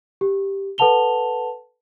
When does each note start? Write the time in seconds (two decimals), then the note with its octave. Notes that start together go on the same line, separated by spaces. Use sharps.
0.21 G4
0.78 A4 B4 F#5 A5 F7 G7